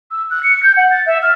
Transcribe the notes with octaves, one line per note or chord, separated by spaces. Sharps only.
E6
F#6
C#7
G6
F#5
A6
E5
F6